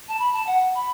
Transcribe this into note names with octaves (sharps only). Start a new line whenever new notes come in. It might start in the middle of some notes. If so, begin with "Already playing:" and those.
A5
B5
A5
F#5
B5